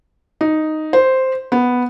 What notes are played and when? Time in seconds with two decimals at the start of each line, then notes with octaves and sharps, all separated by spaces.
0.41 D#4
0.93 C5
1.52 B3